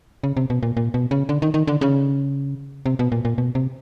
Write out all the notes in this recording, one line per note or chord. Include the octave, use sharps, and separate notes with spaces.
C#3
C3
B2
A#2
A#2
B2
C#3
D3
D#3
D#3
D3
C#3
C3
B2
A#2
A#2
B2
C3